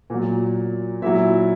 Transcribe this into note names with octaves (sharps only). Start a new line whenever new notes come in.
A#2 F#3
A#2 F#3 E4 E5